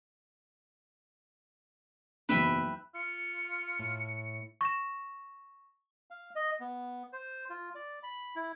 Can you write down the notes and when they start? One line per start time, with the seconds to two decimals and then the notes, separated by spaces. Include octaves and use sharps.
2.29 F#1 B1 E2 B4 E5 G5
2.95 F4 C#7
3.79 A2
4.61 C#6 A#6 E7
6.11 F5
6.35 D#5
6.60 B3
7.13 C5
7.50 F4
7.75 D5
8.03 B5
8.36 E4